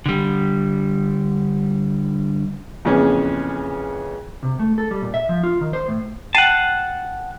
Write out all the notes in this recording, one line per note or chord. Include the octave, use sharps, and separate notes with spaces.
D3 G3
F2 A#2 C#3 E3 B3 C#4
C3
A3
A4
G3
A#2
E5
F3
F4
D#3
C5
A2
F#5 G5 A5 C7 D#7